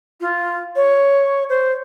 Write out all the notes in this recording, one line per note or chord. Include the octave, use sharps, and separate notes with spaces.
F4
C#5
C5